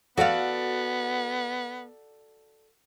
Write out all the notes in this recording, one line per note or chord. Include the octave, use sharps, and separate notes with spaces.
B3 F#4 A4 D5 F5 F#5